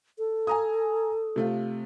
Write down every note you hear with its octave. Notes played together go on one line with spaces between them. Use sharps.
A4
G#5 A#5 D#6
C3 A3 F4